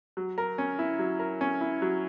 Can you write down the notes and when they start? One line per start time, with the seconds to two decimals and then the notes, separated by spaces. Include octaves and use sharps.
0.17 F#3
0.38 A#4
0.58 C#4
0.79 E4
0.99 F#3
1.19 A#4
1.41 C#4
1.61 E4
1.82 F#3